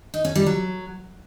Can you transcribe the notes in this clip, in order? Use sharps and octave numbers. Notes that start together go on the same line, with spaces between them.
D#4
C#4
G3
F#3